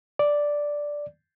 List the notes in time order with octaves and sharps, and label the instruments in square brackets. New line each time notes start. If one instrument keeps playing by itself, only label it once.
[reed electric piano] D5